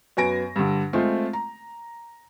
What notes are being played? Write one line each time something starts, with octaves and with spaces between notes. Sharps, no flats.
F#2 B3 G#5 A#6 D7
G2 D3
G#3 A3 C4 F4
A#5